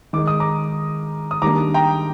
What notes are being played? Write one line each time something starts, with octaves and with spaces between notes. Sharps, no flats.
D#3 G#3 D#4 D6
D#6
A#5 D6
D#6
D#3 G3 A#3 D4 A#5 D6
G5 A#5